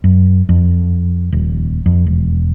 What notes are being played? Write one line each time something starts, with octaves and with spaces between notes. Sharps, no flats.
F#2
F2
D#1
F2
E1